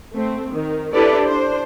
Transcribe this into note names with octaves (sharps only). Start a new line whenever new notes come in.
A3 C4
D#3
D4 E4 G4 A4 B4 D5
D4 C5